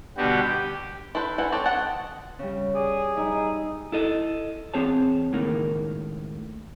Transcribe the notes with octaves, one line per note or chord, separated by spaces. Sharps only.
B2 D3 G3 B3 F#4 G4
G4
E4 A4 B4 C5
E3 E4 F#5
C4 G4 A4 C5 C#5
D#5 F#5 A5
C#3 G3
G#4 D5
G3 D#4 E4
E4 A4 D#5
E2 C4 G#4 C#5 A5
C#2 A2 D#3 A#3